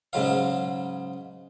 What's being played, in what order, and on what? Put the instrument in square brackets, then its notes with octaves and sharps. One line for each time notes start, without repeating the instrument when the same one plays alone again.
[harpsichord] G#2 C#3 F#3 F5